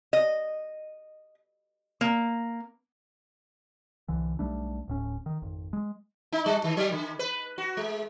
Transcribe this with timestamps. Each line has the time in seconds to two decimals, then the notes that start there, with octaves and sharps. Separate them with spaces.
0.13 D#5
2.01 A#3
4.08 C2 D3 E3
4.39 B1 G3 A3 D4
4.88 D1 A2 C#4
5.26 D#3
5.42 G#1 F2
5.73 G#3
6.32 D#4
6.46 G3
6.64 D#3
6.77 F#3
6.92 D3
7.19 B4
7.58 F#4
7.77 G#3